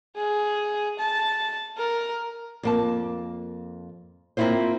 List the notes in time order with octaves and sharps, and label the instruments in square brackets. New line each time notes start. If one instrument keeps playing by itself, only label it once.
[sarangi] G#4
A5
A#4
[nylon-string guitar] F2 A#3 A5
A#3 C4 C#4 E4 F4 C5